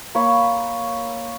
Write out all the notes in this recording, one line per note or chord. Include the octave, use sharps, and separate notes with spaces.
A#3 C#5 B5